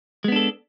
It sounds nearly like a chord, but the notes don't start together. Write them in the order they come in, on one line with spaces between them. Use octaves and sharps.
G#3 B3 D4 A4